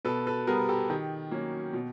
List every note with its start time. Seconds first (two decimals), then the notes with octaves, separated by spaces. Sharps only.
0.05 B2 A4 B4
0.27 A4 B4
0.47 G3 B3 G#4 A#4
0.69 G4 A4
0.90 D#3 G4
1.31 F#3 A#3 C#4
1.73 B2